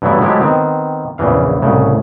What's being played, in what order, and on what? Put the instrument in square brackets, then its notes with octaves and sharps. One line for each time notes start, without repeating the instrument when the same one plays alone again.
[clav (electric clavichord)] G2 E3 F#3 A3 B3 E4
F3 F#3 G#3 A3 E4 G4
D#3 B3 C4
A#1 E2 C#3 E3 F5
C2 A2 C#3